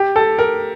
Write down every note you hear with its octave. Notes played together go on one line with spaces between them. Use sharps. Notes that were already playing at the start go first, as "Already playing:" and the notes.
Already playing: G4
A4
A#4